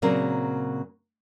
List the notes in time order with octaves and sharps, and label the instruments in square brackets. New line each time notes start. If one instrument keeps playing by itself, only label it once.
[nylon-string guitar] A#2 C#3 F#3 C4 C#4 A#4